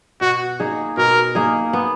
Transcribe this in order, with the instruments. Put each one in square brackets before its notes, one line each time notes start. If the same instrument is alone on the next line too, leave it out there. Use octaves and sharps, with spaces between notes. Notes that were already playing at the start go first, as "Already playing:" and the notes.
[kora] B2 [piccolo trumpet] F#4
[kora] A#3 D#4 G#4
[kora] B2 [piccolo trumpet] A#4
[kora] A#3 D#4 G#4
B3